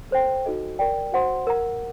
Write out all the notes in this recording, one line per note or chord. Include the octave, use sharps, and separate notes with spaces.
A4 C5 G5
D#4 F#4 A4 D#5
A#4 D5 G5
F#4 C5 F#5 C6
A#4 F#5 A#5